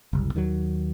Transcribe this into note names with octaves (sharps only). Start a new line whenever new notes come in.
F#1 C2
D#2 D#3 E3 F#3